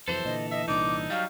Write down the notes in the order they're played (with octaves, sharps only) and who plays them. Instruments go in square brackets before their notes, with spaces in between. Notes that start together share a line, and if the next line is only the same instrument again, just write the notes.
[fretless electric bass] F2 C3 F#3 [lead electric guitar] E3 A4 [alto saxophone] C5
[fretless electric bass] A#2 D3 [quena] D#5
[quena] D#5 [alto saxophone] E5
[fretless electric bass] C2 A#2 D4 [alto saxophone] D#4 [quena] D6
[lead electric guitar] F#3 G3 [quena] F5